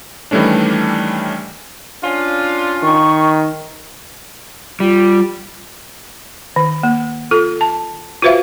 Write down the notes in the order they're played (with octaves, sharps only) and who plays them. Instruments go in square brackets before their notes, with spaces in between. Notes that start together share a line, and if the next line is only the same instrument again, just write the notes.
[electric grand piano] D#3 E3 G3 A3 C#4 D4
[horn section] C#4 D4 F4
[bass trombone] D#3 [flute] C#6
[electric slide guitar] G3 [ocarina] F4
[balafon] D#3
A#3
F4 A4
A5
F4 F#4 B4 C5 E5 F5